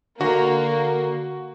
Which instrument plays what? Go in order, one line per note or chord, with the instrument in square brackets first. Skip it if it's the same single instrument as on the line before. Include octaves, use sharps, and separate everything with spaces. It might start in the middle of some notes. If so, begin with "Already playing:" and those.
[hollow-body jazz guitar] D3 [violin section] A#3 [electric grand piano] F#4